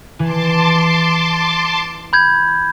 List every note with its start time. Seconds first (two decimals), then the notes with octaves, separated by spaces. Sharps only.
0.19 E3 A5 C6 D6
2.13 B5 G6 G#6